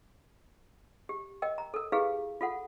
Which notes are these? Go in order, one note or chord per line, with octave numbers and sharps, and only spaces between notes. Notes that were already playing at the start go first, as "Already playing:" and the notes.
G4
A#4 D#5 G5
A#5
A4 A#4
E4 G4 G#4 B4 F5
F4 A4 F#5